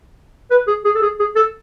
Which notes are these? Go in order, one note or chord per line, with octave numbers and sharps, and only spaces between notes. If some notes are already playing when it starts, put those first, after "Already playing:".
B4
G#4
G#4
A4
G#4
G#4
A4